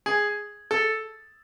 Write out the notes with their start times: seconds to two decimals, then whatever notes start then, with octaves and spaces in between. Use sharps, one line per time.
0.06 G#4
0.71 A4